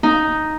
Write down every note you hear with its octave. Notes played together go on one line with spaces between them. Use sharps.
D#4